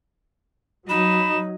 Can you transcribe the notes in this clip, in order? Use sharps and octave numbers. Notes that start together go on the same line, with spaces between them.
F#3 D#4 B5 E7